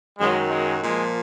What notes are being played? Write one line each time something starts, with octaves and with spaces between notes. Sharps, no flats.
F#2 D#3 F#3 G#3
G#3
A#2 F3 G#3